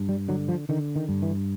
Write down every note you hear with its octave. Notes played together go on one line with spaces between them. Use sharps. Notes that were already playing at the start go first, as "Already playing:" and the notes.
Already playing: G2
G3
D3 F#3
F3
D3 D#3
D#3
G2
E3